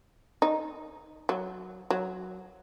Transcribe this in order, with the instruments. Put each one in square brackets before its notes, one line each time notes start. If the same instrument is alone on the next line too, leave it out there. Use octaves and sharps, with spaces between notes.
[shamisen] D#4
F#3
F#3